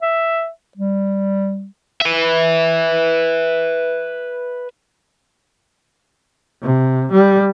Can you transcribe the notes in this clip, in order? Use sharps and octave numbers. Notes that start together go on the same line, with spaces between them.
E5
G3
B4 E5
C3
G3